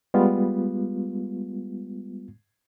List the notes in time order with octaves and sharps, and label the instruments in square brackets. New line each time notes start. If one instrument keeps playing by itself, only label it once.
[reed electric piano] G3 G#3 B3 F4